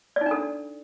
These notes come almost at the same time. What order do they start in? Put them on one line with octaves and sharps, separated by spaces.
D5 D#4 D4 A4